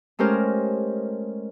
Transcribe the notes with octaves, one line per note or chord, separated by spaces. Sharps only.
G#3 A3 C#4 G4 A#4 C5